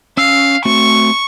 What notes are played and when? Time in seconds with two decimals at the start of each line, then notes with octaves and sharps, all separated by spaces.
0.17 C#4 F5 E6
0.65 A3 C4 F#4 C#6